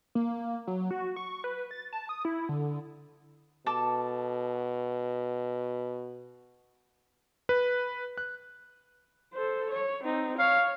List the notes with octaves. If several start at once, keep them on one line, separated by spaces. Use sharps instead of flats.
A#3
F#3
F#4
C#6
B4
A6
A5
D#6
E4
D3
B2 A4 A5 D6
B4
F#6
A4 C5
C#5
C4 D#4
C#5 F5